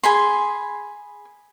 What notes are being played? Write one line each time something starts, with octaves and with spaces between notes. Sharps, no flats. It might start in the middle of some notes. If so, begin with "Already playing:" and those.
G#4 B5 C6